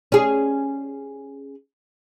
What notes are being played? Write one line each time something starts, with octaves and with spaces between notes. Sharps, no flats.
C#4 G#4